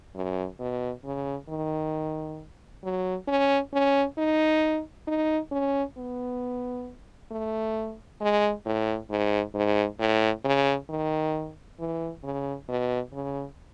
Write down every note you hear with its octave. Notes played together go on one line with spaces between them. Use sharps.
F#2
B2
C#3
D#3
F#3
C#4
C#4
D#4
D#4
C#4
B3
A3
G#3
A2
G#2
G#2
A2
C#3
D#3
E3
C#3
B2
C#3